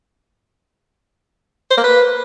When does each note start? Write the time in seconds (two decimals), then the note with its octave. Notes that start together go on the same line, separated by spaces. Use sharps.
1.71 C5
1.77 A#3
1.84 B4